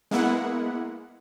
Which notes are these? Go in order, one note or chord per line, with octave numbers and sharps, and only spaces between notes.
G#3 A#3 B3 E4 F#5